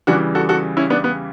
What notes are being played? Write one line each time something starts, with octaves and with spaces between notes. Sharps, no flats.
E2 C#3 E3 G3 D4 F#4
F#4 A4
F#4 A4
C#4 E4
B3 D4
B3